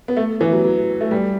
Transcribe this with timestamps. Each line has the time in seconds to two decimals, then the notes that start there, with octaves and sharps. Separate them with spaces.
0.08 B3
0.17 A3
0.41 E3
0.53 F#3
0.64 F#3
1.01 A3
1.11 G3